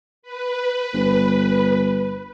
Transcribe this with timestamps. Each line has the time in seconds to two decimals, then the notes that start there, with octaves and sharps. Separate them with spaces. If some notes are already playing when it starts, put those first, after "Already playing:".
0.23 B4
0.93 G1